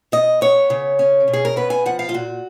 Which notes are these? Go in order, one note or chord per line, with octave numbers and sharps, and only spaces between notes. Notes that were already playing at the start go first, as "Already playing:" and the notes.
B2 D#5
B3 C#5
C#3
C#4
B2
G#4
A#4
B3 B4
G#5
F3 F#5
F5
F4
A#2 F#4